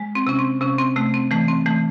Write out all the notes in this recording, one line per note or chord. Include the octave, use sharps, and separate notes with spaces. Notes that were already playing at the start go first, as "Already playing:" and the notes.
Already playing: G#3
C4
C3 C#4
C4
C3 C#4
C4
C3 A3
C4
E3 A3
C4
E3 A3